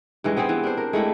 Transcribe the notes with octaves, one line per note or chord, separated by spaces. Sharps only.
G2 E3 G#3
B3 C4 G4 G#4
E3
D4 C5
A#4
G#3 A3 E4 G4